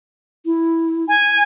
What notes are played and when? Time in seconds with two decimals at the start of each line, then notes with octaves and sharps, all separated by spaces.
0.46 E4
1.08 G#5